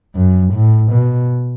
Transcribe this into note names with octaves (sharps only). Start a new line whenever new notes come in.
F#2
A2
B2